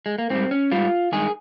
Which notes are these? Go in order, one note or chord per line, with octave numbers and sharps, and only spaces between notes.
G#3
A#3
G#2 G3 C4
C#4
G#2 G3 F4
G2 D#3 G#3 G#4